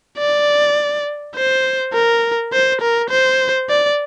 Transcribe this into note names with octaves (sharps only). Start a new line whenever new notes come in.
D5
C5
A#4
C5
A#4
C5
D5